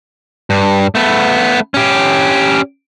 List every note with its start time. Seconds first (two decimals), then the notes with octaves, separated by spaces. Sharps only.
0.50 G2
0.95 A3 B3
1.74 C#4 G4